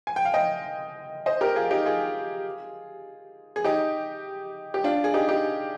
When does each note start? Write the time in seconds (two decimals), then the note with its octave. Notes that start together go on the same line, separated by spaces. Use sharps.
0.07 G#5
0.16 G5
0.25 F5
0.34 D#5 G5
1.26 C5 D#5
1.41 G4 A#4
1.56 F4 G#4
1.71 D#4 G4
1.86 F4 G#4
3.56 G#4
3.64 D#4 G4
4.74 G4
4.84 D4 F4
5.04 G#4
5.14 D#4 G4
5.29 D#4 G4